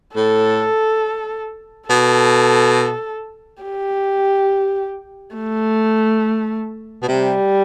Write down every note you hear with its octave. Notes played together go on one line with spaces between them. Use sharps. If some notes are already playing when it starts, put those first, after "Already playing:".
A2 A4
B2 A4
G4
A3
B2
C3 G3